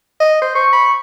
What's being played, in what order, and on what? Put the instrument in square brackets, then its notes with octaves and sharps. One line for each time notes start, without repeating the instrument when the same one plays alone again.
[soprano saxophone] D#5
C5
[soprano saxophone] C5 [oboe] C#6
[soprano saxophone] B5